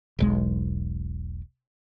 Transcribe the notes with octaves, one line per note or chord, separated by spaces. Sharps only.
E1 B1 G#3